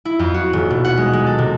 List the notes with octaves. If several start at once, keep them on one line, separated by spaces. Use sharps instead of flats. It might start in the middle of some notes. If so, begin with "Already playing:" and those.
E4
F2
F#4
D#1
B2
F#5
G#3
G#3
A4
C3